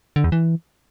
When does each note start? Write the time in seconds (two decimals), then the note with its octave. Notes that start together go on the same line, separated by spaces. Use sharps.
0.16 D3
0.24 E2
0.32 E3